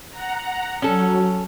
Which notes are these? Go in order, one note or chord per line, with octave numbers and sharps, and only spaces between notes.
F#5 A#5
F#3 C#4 A4